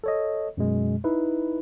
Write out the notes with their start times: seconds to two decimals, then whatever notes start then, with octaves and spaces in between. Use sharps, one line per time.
0.04 A4 C#5 D#5
0.57 F#2 B2 G#3
1.04 D#4 E4 B4